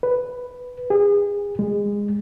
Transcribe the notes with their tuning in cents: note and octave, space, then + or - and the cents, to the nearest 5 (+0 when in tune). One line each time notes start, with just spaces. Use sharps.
B4 +5
G#4 -30
G#3 -20